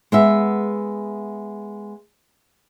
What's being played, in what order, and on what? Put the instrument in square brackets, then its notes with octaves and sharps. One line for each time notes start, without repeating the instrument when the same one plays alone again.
[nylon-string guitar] G#3 B3 E5